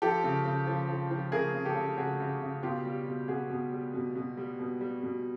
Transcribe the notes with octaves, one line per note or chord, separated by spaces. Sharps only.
F3 G4 A4
C#3
C#3
F3
F3
F3
C#3 G#4 A#4
C#3
G4 A4
C#3
C#3 F#4 G#4
C#3
C#3
B2 F4 G4
G3
B2
B2 F#4 G#4
B2
G3
B2
B2
G3
B2
G3
B2